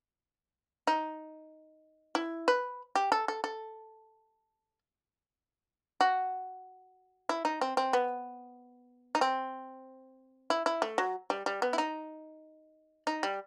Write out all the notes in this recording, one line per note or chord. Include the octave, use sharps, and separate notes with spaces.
D#4
E4
B4
G4
A4
A4
A4
F#4
E4
D#4
C4
C4
B3
D#4
C4
E4
E4
A3
F#3
G3
G3
B3
E4
D#4
D#4
G3